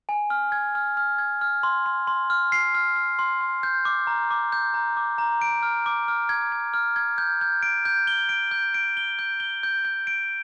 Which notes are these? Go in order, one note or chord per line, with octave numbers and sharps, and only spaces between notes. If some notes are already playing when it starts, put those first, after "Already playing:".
G#5
F6
G#6
F6
F6
G#6
F6
C6
C6
C6
F6
C7
F6
F6
C6
C6
G6
D6
A#5
D6
G6
A#5
D6
A#5
D7
F6
D6
F6
G#6
G#6
F6
G#6
G6
G6
D7
G6
G7
D7
G6
D7
G7
G6
G7
G6
G6
D7